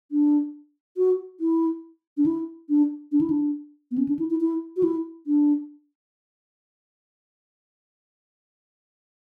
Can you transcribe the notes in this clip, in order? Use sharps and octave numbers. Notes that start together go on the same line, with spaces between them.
D4
F#4
E4
D4
E4
D4
D4
E4
D4
B3
C#4
D4
E4
E4
E4
F#4
E4
D4